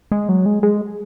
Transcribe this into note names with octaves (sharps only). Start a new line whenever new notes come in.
G#3
F#3
G#3
G#3